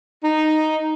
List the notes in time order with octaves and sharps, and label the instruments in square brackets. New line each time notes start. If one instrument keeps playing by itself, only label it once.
[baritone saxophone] D#4